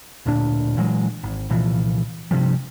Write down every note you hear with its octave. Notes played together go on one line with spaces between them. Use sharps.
D1 D2 A#2 D4
A#2 E3 F#3 G#3
G#1
C2 A#2 E3 F3
G2 C3 F3 G3